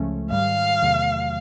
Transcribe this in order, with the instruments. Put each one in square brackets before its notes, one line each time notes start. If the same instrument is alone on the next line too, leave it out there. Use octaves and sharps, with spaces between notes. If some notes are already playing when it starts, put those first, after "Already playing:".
Already playing: [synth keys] C#2 C#3 F3 A3 C#4
[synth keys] G#2 D#3 G3 [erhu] F5
[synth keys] E2 C3 D#3 F#3 A3